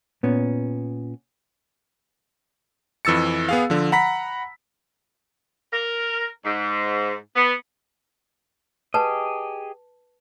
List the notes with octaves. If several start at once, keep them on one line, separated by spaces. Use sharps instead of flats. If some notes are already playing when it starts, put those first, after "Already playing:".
A#2 B3 C#4
F2 E3 E6 A6 C#7
B3 G#4 F5
D3 F3
F#5 A#5 B5 B6
A#4
G#2
B3
G4 G#4 B4 D#5 A5